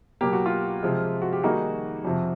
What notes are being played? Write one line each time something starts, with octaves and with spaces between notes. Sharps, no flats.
B2 F#3 A#3 G4
F#4
F4 G4
C3 F3 G#3
F#4
G4
D#3 G3 A#3 D#4 F#4 G#4
F2 C3 F3